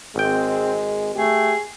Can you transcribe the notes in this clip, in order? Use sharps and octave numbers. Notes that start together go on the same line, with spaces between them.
G#1 G#3 C4 G5
A3 G4 G#4